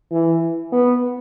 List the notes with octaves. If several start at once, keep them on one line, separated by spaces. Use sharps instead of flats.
E3
B3